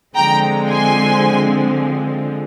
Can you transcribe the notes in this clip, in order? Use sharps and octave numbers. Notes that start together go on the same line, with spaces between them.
D3 F3 G#3 C4 G5 A#5
G#5 C6